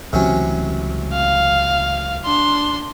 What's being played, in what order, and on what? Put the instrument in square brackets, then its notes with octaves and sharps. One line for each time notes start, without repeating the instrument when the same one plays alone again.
[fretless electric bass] C#2 E3 A3 [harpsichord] C3 F#3 C#4
[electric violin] F5
D4 C6